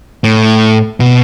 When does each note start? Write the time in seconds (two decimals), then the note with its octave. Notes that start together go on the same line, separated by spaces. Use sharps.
0.24 A2
1.00 B2